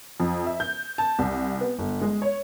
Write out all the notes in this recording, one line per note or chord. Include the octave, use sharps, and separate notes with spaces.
F2
E5
G6
A5
C2
B3
G1
G#3
C#5